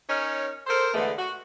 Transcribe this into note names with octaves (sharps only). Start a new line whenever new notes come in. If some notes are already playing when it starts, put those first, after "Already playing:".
C#4 D#4 A#4 C#5 D#5
A4 A#4 C5
E2 D3 G#3 A3 B3
F#4